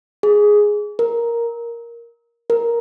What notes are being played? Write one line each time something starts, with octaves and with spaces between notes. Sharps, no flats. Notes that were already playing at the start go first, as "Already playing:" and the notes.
G#4
A#4
A#4